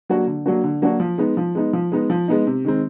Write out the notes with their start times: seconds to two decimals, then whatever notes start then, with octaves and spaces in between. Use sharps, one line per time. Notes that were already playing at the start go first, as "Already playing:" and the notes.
0.09 F#3 A#3 D4 F#4
0.27 D3
0.46 F#3 A#3 D4 F#4
0.64 D3
0.82 F#3 A#3 D4 F#4
1.00 F3
1.18 G#3 B3 D#4
1.37 F3
1.55 G#3 B3 D#4
1.73 F3
1.92 G#3 B3 D#4
2.10 F3
2.28 G#3 B3 D#4
2.47 C3
2.65 D#3 G#3 C4